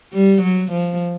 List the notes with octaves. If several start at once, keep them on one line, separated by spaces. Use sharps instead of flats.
G3
F#3
F3